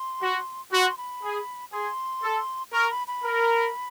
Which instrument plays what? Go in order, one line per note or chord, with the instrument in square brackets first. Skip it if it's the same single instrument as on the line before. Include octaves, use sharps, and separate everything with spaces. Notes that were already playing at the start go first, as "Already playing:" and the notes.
Already playing: [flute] C6
[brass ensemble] F#4
[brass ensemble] F#4 [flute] C6
[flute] B5
[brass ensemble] G#4
[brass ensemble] G#4 [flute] C6
[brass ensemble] A4
[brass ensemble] A#4 [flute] C#6
[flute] B5
B5
[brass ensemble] A#4